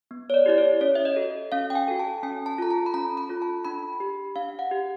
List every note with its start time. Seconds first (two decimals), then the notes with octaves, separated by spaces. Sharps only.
0.11 B3
0.30 C#5
0.34 D5
0.46 E4 G4 D5
0.58 C#5
0.81 C#4 C#5
0.95 E5
1.05 D#5
1.16 F#4 A4
1.52 C#4 F5
1.70 G5
1.75 G#5
1.88 F#4 A4
1.99 A5
2.23 C#4 G#5
2.46 A5
2.58 F4 A4 A#5
2.71 A5
2.86 B5
2.94 C#4 A#5
3.17 B5
3.29 F4 A4
3.42 A5
3.65 D4 B5
4.00 G4
4.36 D4 F5
4.59 F#5
4.71 G4